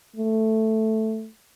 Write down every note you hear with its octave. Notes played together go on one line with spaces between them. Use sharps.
A3